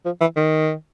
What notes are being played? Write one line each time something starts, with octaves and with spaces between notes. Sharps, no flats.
F3
E3
D#3